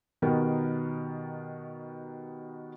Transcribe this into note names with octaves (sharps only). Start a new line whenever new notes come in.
B2 D#3 B3 G4 A#4